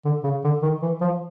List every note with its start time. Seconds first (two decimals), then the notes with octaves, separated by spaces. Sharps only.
0.05 D3
0.23 C#3
0.44 D3
0.62 D#3
0.82 E3
1.01 F3